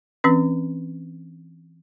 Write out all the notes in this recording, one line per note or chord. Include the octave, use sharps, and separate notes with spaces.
E3 C4 C#4 B4